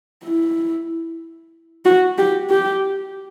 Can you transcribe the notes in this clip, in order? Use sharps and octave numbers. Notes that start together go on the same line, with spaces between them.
E4
F#4
G4
G4